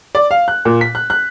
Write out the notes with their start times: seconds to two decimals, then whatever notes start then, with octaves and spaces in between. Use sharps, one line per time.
0.15 D5
0.31 F5
0.48 F#6
0.65 A#2
0.81 B6
0.95 F#6
1.10 F#6